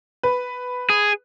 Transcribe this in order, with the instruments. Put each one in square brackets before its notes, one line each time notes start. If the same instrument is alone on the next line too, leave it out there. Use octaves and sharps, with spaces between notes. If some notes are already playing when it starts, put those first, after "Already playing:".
[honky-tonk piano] B4
[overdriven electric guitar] G#4